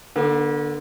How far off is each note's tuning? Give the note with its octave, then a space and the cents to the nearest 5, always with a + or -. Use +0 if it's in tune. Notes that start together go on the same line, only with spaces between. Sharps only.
D3 +10 B3 -45